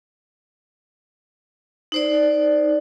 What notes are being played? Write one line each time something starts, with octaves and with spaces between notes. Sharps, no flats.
D#4 C5 D5